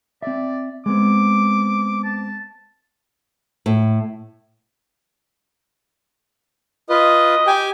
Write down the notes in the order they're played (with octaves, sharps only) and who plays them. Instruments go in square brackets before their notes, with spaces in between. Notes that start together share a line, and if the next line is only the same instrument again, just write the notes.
[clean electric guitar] C4 E5 [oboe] D5
[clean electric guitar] G#3 B3 C4 [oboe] D6
[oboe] A5
[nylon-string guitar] A2
[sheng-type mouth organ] F4 B4 [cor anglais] D#5
[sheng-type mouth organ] G4 G5 G#5